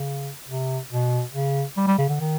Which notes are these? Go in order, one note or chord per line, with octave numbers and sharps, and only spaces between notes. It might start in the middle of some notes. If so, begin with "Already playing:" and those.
Already playing: C#3
C3
B2
C#3
G3
G3
C#3
D3
D#3